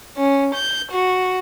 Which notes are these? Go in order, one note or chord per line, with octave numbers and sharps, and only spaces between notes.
C#4
G6
F#4